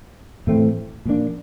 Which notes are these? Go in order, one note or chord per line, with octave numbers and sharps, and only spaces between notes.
A2 E3 A3 C4
A#2 F3 A#3 D4